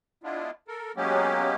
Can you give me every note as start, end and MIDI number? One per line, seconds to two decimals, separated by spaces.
0.23 0.51 56
0.23 0.51 59
0.23 0.51 62
0.23 0.51 64
0.23 0.51 65
0.68 0.92 69
0.68 0.92 70
0.96 1.56 54
0.96 1.56 56
0.96 1.56 58
0.96 1.56 59
0.96 1.56 61
0.96 1.56 67